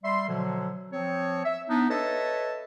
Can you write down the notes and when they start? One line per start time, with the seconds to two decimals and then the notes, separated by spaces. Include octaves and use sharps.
0.04 G3 E5 C6
0.28 B2 D3 F3 F#3
0.93 F3 C4 C#5
1.45 E5
1.70 B3 D4 D#4
1.90 A4 B4 C#5 D#5 E5 A5